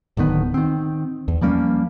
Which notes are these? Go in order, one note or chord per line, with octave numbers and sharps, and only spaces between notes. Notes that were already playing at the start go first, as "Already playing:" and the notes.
D1 D3 D#3 B3
D#3 C4
E2
F3 G3 A#3 C#4